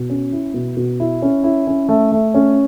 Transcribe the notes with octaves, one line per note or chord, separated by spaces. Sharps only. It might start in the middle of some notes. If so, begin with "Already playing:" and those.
Already playing: B2
C#4
E4
B2
B2
E4
C#4
E4
C#4
A3
A3
C#4